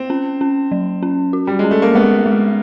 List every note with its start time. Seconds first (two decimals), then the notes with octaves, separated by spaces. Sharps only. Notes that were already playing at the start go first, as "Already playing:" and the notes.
Already playing: C4
0.10 C#4
0.41 C#4
0.71 F#3
1.03 C#4
1.33 F#4
1.47 G3
1.59 G#3 C#4
1.71 A3
1.82 A#3
1.95 G#3 B3
2.26 G#3